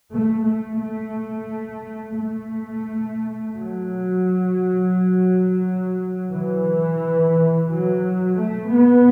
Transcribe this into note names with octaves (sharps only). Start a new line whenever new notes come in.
A3
A3
A3
A3
F#3
E3
F#3
A3
B3